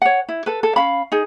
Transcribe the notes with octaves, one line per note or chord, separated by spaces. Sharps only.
C#5 F#5
E4
A4 B4
A4
C#4 F5 B5
D#4 G#4